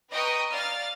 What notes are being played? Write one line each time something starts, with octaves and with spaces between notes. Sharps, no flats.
B4 D#5 G5 A#5 C#6 D#6
D5 F5 A#5 F6 A6